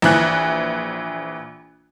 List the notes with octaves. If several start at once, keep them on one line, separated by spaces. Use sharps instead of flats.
A#1 E3 F#6